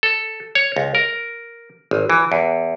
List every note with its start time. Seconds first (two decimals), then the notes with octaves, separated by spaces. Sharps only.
0.03 A4
0.55 C#5
0.76 C#2
0.95 A#4
1.91 G#1
2.10 E3
2.32 E2